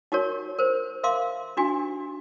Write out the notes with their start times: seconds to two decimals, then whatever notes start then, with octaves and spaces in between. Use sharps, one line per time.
0.12 D#4 F#4 G4 A#4 C#5
0.59 A#4 C5
1.03 A#4 E5 F5 C6 D6
1.57 D4 D#4 F#4 G4 G#5